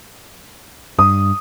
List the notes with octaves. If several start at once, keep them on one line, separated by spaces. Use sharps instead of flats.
G2 D#6